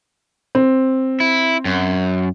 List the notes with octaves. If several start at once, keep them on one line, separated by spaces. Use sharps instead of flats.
C4
E4
F#2